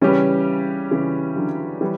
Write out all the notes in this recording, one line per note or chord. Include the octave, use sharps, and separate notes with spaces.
C#3 E3 G3 C#4 G4 B4
C#3 E3
D3 F#3
E3 G3